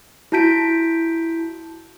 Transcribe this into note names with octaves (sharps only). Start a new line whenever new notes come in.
E4 F#4 A5 G6 B6 D7